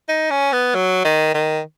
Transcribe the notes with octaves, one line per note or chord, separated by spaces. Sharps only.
D#4
C#4
B3
F#3
D#3
D#3